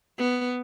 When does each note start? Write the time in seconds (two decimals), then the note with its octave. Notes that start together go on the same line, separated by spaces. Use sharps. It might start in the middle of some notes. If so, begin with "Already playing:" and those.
0.18 B3